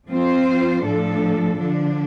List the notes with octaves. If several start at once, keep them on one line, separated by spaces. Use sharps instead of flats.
F3 C4 F4 C5
A2 F3 D4 A4
D3 F3 D4